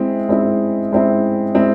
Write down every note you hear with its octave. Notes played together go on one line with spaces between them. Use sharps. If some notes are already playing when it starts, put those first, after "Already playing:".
Already playing: G#3 C4 E4
G#3 C4 E4
G#3 C4 E4
G#3 C4 E4